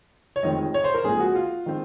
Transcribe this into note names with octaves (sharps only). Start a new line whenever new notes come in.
C#5
F1 F2 D#3 G#3 C4 D#5
C#5
C5
A#4
A#1 A#2 G#3 C4 G#4
F#4
F4
D#3 G#3 C4